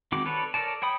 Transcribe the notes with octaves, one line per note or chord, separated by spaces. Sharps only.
D#3 G#3 C4 F#4 D6
A4 B4 C#5 D5
A4 A#4 C#5 D5 A5
C#5 G5 B5 D#6